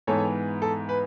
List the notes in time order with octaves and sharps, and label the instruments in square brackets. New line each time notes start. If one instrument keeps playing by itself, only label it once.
[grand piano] G#2 E3 B3 A4 C#5
A4
B4